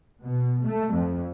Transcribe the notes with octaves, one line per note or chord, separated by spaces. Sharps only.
B2
A3
F2